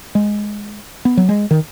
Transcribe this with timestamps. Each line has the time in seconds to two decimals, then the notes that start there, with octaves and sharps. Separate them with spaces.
0.15 G#3
1.05 B3
1.17 F#3
1.29 G#3
1.51 D#3